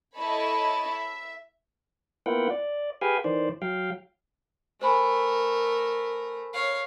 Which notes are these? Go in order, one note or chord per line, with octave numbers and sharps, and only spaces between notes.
E4 A4 C#5 D#5 A5 B5
E5
A#3 B3 E4 F4 F#5 G5
D5
G4 G#4 B4 F5 G5 G#5
D#3 E3 C5 D5
F#3 F5 G5
A3 A#4 C5 G#5 B5
C#5 F5